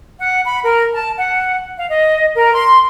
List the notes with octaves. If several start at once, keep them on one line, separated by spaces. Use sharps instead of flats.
F#5
B5
A#4
A5
F#5
F5
D#5
A#4
C6